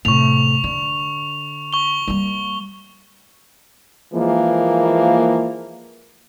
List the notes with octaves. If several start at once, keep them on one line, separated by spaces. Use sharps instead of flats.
A2 C3 C#6 F7
D3
C#6 G7
G3 A#3
E3 F3 G#3 A#3